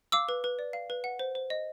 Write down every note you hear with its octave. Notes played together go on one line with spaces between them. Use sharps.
F5 D6 E6
B4
B4
D5
F5
B4
F#5
C5
C5
D#5